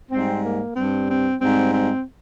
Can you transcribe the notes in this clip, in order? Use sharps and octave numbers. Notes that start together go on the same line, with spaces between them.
G#2 G3 C4
A#3
G2 G3 C4
C4
G#2 G3 C4
C4